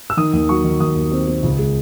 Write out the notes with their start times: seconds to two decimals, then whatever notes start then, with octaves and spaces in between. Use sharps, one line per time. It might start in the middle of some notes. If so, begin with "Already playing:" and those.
0.10 E6
0.17 D#3 D#6
0.33 D#2
0.49 F#3 C#6
0.64 D#3
0.80 D#2 D#6
0.96 D#2
1.12 C4
1.27 C4
1.43 C#2
1.58 G#3